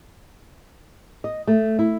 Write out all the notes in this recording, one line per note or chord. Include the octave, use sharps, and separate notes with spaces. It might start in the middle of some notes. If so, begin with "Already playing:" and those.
D#5
A3
E4